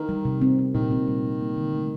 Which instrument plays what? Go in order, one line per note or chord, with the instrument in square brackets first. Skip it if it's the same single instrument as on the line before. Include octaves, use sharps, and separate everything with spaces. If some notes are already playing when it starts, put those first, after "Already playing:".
Already playing: [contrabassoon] D#3 [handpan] A#4
[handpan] G3
C3
C4
C4
[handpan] A#2 [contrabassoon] D#3
[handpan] C4
G3
A#3
A#3
D3
A3